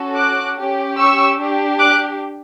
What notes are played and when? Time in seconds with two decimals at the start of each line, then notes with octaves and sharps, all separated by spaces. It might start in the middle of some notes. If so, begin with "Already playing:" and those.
Already playing: C#4 F#4 A4
0.16 D6 F#6
0.57 C#4 G4
0.98 C#6 E6
1.39 D4 G4
1.79 D6 F#6